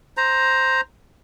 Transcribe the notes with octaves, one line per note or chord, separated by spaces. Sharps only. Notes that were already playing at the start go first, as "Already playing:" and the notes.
C5 A#5